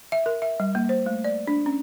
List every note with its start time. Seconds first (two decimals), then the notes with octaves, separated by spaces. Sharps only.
0.12 E5
0.26 A#4
0.42 E5
0.60 G3
0.75 A#3
0.89 C5
1.06 A3
1.24 D5
1.47 D4
1.66 C#4